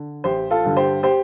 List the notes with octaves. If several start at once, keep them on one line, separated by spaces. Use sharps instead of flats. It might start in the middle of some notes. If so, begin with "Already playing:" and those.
Already playing: D3
A1 G4 C5
F4 A4
G2 D3
G4 C5
G4 C5